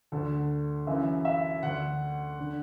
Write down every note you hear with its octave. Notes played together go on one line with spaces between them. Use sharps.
D2 D3 A4
F#2 E3 E5
E5
D2 D3 F#5
D3